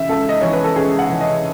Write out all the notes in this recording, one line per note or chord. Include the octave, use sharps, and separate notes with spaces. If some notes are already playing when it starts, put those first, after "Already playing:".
Already playing: C#3 E3 E5
C#2 A4
D#5
E3 C#5
B4
A4
C#2 G#4
F#5
E3
D#5